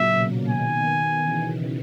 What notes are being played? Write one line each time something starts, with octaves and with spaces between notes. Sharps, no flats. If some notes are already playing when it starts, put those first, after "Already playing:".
Already playing: A#2 C#3 F#3 A#3 E5
B2
B2 D#3 G#5
C#3 E3